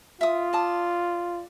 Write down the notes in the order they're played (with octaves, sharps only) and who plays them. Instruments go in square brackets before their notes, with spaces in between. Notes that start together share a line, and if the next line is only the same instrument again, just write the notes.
[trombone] F4 [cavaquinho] E5 D#6
[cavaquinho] D5 A5 D#6